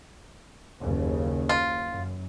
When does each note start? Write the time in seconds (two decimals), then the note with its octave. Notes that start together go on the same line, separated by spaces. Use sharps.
0.81 F#1 D#2 C#3
1.49 F4
1.90 F#2